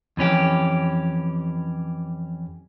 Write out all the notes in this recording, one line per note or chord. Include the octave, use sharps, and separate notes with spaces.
F2 E3 C#4 G4